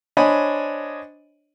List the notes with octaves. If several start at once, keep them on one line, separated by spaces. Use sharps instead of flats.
D4 C5 C#5 D#5 G#5 B5